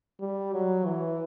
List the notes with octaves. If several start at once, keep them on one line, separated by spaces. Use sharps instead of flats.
G3
F#3
E3